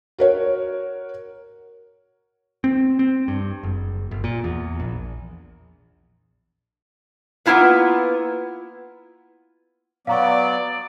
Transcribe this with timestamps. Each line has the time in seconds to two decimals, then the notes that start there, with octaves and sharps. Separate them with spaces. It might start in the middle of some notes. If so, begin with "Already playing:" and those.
0.18 F#4 A#4 C#5
2.64 C4
2.99 C4
3.28 G2
3.63 F#1
4.11 G1
4.24 A#2
4.44 E2
4.80 A#1
7.46 A#3 B3 C#4 E4 F4 B4
10.07 F#3 B3 D5 F5 A#5 C#6